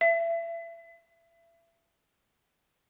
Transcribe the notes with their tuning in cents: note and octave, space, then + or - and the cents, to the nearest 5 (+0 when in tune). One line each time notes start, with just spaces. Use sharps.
E5 +30